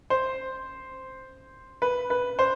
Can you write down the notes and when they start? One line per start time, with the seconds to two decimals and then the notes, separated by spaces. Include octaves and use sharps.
0.10 C5
1.82 B4
2.10 B4
2.39 C5